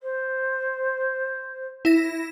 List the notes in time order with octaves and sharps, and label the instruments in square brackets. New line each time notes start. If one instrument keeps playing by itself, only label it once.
[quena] C5
[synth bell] E4 A#6